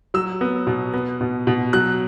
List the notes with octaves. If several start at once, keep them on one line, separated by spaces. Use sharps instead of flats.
F#3 E6
B3
B2
B3
B2
B2
F#3 F#6